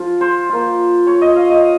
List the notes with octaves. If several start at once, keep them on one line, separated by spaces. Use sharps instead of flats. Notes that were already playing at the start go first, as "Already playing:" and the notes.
Already playing: F3 F4
C5
A#3 F4
C#5
D#5
F5
D#5